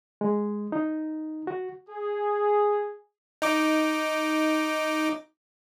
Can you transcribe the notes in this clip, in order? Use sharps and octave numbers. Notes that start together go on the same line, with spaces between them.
G#3
D#4
F#4
G#4
D#4 D6